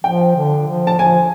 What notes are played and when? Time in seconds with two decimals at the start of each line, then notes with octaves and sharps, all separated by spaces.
0.04 F3 G5
0.36 D3
0.67 F3
0.87 A5
0.98 F3 G#5